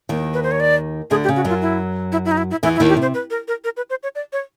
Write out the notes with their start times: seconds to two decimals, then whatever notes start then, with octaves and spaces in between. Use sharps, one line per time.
0.09 D#2 D#3
0.34 B4
0.43 C5
0.51 C#5
0.60 D5
1.10 D2 D3 G#4
1.24 G4
1.29 C#3
1.36 F#4
1.45 F#2 F#3 F4
1.62 E4
2.12 E4
2.25 E4
2.31 D#4
2.37 E4
2.51 E4
2.63 E2 E3 E4
2.76 E4
2.80 D#2 D#3
2.89 G4
2.97 C3
3.02 C5
3.14 B4
3.30 A#4
3.48 A#4
3.64 A#4
3.77 B4
3.90 C5
4.03 C#5
4.15 D5
4.33 C#5